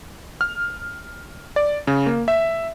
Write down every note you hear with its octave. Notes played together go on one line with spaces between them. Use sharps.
F6
D5
C#3
A#3
E5